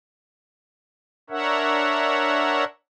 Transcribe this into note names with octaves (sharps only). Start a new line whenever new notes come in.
D4 A#4 C#5 E5 F#5